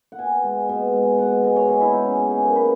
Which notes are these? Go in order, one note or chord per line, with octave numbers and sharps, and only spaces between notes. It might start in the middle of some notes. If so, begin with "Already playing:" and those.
F#5
B2 G#5
G#3
B2
G#3
B2 F#5
G#3 D#5
C#5
B2 G#4
E4
G#3 D#4
C#4
B2
G#4
F#3 A#3 A#4
B4